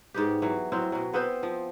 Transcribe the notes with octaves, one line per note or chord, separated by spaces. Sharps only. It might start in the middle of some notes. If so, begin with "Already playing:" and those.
G#2 B3 G4
E3 F#3
A2 F#3 C4
B2 F#3
B3 C4 B4 C5
F3